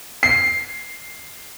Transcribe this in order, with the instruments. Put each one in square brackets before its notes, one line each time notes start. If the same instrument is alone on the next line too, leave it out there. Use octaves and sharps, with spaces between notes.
[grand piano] C7